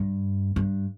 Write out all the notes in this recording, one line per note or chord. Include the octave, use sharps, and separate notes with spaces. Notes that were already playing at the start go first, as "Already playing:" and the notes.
Already playing: G2
G2